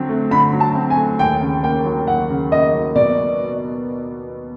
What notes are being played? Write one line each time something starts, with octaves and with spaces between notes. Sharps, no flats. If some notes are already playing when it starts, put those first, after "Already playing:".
Already playing: D3 F#3 C4
A3
D3 B5
F#3
A5
C4
G#5
A3
D#2 G5
C#3
A#3 G5
F#3
D#2 F#5
C#3
A#3 D#5
F#3
B2 D5